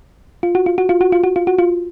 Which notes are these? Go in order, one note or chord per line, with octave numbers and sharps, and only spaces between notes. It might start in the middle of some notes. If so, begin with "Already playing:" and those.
F4
F#4
F4
F#4
F4
F#4
F4
F#4
F4
F#4
F4